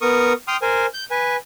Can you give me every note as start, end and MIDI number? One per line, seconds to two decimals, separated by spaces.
0.02 0.33 59
0.02 0.33 70
0.02 0.33 85
0.02 0.33 87
0.48 0.57 79
0.48 0.57 84
0.48 0.57 87
0.48 0.57 89
0.62 0.86 70
0.62 0.86 72
0.62 0.86 80
0.94 1.04 91
1.11 1.37 71
1.11 1.37 80